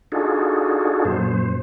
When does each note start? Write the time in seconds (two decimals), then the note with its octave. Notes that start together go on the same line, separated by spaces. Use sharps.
0.12 D4 D#4 F4 F#4 G#4 A4
1.05 F#2 A#2 C5